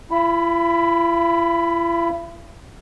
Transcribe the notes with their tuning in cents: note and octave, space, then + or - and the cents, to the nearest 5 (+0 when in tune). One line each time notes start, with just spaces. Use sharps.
E4 +45 B5 +10